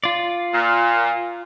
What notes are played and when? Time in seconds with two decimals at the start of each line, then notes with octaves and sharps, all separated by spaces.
0.04 F4 D5
0.53 A#2